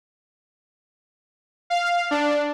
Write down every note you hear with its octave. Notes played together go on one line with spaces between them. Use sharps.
F5
D4